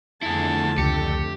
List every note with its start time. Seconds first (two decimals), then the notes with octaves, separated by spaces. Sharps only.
0.22 F2 D3 A3 E4 G#4 A5
0.78 C#2 G4 C#7